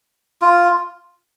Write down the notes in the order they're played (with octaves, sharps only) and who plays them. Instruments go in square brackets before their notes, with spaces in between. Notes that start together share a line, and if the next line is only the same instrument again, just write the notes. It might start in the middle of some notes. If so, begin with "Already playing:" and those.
[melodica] F4